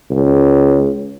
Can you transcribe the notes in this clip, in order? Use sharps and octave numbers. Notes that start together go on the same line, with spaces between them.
C#2